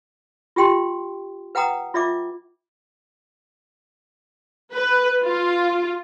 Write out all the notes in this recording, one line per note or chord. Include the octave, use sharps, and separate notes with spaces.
F4 G4 G5 C6
B4 F#5 G5 A#5 D#6
F4 D5 E5 D6
B4
F4